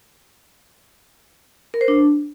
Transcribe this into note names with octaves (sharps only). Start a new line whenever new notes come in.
A#4
C5
D4